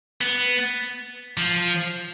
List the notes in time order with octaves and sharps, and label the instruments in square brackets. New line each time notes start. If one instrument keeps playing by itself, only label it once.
[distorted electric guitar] B3
F3